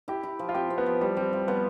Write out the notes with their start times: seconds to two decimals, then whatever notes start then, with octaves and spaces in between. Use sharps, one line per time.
0.08 E4 G4
0.23 E4
0.39 F3
0.49 F4
0.54 C4 G4
0.70 C4
0.78 B3
0.86 F3
1.01 G3 E4
1.17 G3 C4
1.33 F3
1.48 F3 B3